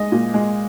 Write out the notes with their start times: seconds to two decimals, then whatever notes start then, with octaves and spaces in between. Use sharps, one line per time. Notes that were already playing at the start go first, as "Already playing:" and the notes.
Already playing: G#3 D#5
0.12 A#2
0.34 G#3